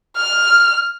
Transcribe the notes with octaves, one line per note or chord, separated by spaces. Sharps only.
F6